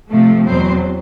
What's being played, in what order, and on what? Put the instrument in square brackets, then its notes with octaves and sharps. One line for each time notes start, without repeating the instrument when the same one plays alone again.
[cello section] C3 F3 A3
E2 B2 F#3 C4 C5